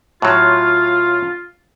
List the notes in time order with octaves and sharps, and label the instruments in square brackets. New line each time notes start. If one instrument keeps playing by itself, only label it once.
[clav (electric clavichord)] A2 F#3 [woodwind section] F4